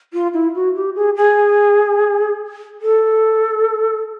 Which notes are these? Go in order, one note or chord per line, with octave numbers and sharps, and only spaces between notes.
F4
E4
F#4
G4
G#4
G#4
A4